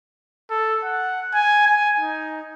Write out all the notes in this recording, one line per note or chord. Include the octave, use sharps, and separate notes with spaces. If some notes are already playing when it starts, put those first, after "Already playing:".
A4
F#5
G#5
G#5
D#4